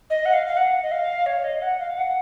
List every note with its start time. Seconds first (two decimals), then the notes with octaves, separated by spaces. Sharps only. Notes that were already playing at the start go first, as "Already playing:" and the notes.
0.10 D#5
0.25 F#5
0.33 F5
0.47 F5
0.57 F#5
0.82 D#5
0.91 F5
1.26 C#5
1.44 D#5
1.62 F#5
1.79 F5
1.97 F#5